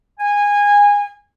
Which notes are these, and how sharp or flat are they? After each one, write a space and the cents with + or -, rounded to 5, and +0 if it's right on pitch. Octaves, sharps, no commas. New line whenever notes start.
G#5 -20